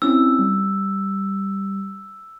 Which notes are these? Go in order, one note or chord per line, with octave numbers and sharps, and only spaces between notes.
C4 C#4 E4 E6
G3